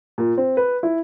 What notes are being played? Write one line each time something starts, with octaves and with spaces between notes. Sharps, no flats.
A#2
C4
B4
E4